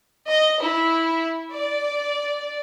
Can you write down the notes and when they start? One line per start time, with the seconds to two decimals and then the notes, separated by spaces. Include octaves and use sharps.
0.29 D#5
0.60 E4
1.52 D5